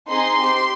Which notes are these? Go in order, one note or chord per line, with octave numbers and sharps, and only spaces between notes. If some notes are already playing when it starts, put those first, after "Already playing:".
C4 D#4 G#4 C6
C4 G4